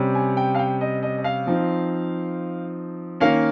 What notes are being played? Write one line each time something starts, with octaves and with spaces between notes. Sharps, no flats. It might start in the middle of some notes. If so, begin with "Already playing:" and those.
Already playing: C3 G3 C#4
G#5
G5
F5
G5
D#5
D#5
D#5
F5
F3 C4 D#4
D#3 A#3 C#4 F5